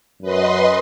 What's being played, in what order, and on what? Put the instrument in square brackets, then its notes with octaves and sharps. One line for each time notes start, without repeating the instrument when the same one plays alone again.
[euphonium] F#2 [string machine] B4 D#5 C6